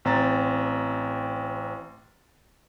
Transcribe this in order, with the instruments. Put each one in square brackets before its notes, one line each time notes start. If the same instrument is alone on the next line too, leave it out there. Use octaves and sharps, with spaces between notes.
[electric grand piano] A1 C4 A#5 A6